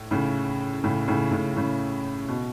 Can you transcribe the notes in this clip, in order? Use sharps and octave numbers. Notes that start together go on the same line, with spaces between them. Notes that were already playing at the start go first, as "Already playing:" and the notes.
Already playing: A2
A2 C#3
A2 C#3
A2 C#3
A2 C#3
A2 C#3
B2